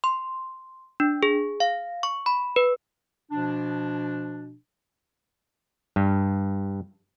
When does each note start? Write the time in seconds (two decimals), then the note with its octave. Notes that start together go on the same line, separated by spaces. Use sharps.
0.04 C6
1.00 D4
1.23 G#4
1.60 F5
2.03 C#6
2.26 B5
2.56 B4
3.31 B2 F3 D4
5.96 G2